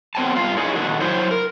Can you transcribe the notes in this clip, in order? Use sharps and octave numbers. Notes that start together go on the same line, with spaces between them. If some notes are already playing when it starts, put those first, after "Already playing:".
B3 C4 C#5 G5 A5
G2 F4 F5
D#4 E4 G#4 C#5
A#2 D#3 D4 F#4 G#4
F#3 E4 C5 C#5
A#4